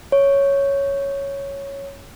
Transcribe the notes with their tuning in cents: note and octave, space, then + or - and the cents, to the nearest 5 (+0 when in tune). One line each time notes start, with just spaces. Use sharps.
C#5 +0